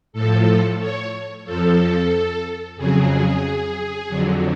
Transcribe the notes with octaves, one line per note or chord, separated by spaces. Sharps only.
A2 F3 A4
C#5
F2 F3 A4
F2 C#3 F#3 G#4
F2 D3 F#3